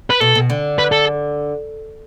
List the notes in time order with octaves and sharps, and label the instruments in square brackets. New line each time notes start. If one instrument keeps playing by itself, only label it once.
[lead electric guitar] B4
[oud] B2 [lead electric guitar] A4
[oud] B2
D3
[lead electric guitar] B4
A4